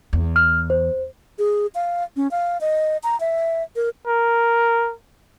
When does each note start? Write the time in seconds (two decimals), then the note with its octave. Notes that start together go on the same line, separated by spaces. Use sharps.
0.13 E2
0.36 F6
0.70 C5
1.39 G#4
1.75 F5
2.17 C#4
2.31 F5
2.61 D#5
3.03 A#5
3.20 E5
3.76 A#4
4.07 A#4